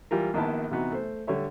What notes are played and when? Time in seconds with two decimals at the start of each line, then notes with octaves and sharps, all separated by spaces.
0.11 E3 G3 F4 A#4
0.34 A#1 D#3 A#3 B3 E4 A5
0.71 C3 E3 B3 D#4 F#4
0.92 A3 C5
1.27 D3 G3 C#5 E5